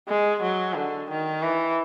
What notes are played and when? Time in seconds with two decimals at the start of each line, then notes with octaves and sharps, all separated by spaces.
0.08 G#3
0.42 F#3
0.76 D3
1.10 D#3
1.43 E3